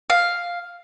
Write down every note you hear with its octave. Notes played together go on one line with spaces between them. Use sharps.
F5